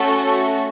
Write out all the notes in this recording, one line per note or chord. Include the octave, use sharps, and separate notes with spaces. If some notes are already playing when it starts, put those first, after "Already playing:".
Already playing: A3 C#4 F#4 A4